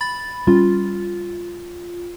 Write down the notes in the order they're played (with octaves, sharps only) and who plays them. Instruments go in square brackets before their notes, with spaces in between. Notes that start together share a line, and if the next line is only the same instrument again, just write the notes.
[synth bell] B5 A6
[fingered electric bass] G3 C#4 [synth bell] F4